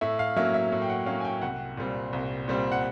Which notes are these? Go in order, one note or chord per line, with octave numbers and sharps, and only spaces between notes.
A2 E5
F5
F#3 A#3 C#4 E5
E5
A2
G5
F#5
F#3 A#3 C#4 F5
G#5
G5
C2 F#5
A#2 G3 C4
C2
A#2 G3 C4
F#5